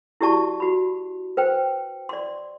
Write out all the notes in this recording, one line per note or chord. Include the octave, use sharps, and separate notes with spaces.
E4 F#4 G4 D5 A5 C#6
F#4 B5
B4 C5 G5
D5 C6